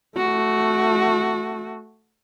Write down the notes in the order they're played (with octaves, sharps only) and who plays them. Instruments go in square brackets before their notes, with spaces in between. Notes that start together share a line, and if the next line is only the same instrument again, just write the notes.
[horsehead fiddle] A3 F#4